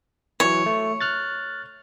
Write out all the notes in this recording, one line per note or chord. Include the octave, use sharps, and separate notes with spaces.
E3 F#3 C#5
A3
F6 F#6 A6